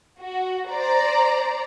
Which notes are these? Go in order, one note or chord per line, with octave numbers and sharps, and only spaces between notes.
F#4
C5 D5 A#5